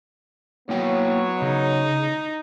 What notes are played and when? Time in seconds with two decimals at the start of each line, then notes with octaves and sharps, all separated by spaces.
0.69 F#3 A#3 B3 E4 C#5 G5
1.42 C#3 D#4